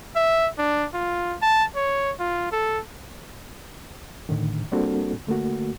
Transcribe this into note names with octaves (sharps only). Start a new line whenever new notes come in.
E5
D4
F4
A5
C#5
F4
A4
A2 D3 D#3
G3 A#3 C4 D4 F#4 A4
D3 A3 A#3 F#4